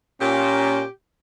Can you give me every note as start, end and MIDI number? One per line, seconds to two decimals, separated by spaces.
0.21 0.83 46
0.21 0.85 61
0.21 0.88 67